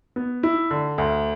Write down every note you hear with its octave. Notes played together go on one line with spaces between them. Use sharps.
B3
E4
D3
D2